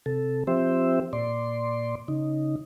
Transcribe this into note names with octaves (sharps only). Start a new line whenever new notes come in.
C3 A4
F3 C4 G4 C5 E5
A#2 D5 C6
C#3 D#4